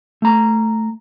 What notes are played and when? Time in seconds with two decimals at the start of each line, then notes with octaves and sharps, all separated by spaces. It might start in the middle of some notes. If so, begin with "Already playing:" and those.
0.22 A3 A#5